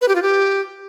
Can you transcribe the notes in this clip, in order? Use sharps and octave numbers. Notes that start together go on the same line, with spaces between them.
B4
G4
F4
G4